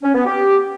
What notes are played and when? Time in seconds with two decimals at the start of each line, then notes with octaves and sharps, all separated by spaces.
0.02 C#4
0.14 B3
0.25 G4